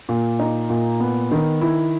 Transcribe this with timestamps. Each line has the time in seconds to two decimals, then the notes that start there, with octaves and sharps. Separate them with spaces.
0.09 A#2
0.39 D#4
0.70 A#2
1.00 B3
1.31 D#3
1.62 E4